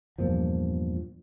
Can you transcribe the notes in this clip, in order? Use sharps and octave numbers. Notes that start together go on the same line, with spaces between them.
E2 G2 A#2 F3